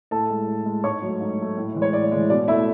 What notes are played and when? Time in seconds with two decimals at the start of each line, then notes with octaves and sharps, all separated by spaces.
0.11 A2 A4 A5
0.30 G#3
0.48 A2
0.66 G#3
0.84 G#2 C#5 C#6
1.02 F#3 A3
1.20 G#2
1.38 F#3 A3
1.57 A2
1.75 E3 G#3
1.82 C#5
1.93 A2 D5
2.11 E3 G#3
2.30 B2 D5
2.48 A3 E4 E5